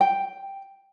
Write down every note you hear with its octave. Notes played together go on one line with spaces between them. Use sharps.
G5